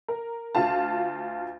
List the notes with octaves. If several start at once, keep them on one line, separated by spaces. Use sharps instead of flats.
A#4
D2 F4 F5 A5